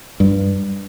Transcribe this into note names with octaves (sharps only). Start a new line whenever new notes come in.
G2